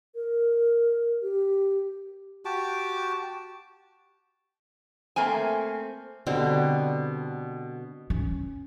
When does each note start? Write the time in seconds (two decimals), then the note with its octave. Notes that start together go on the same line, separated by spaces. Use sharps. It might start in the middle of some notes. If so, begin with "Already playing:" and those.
0.15 A#4
1.22 G4
2.45 F#4 G4 A5 D6
5.16 A3 A#3 C4 G#5
6.27 B2 D3 G3 C4
8.10 C#4